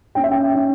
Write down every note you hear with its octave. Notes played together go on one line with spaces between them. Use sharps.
C#4 G5
E5
G5
C#4